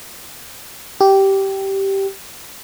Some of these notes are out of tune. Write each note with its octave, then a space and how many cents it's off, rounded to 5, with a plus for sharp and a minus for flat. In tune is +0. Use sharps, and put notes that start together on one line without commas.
G4 -10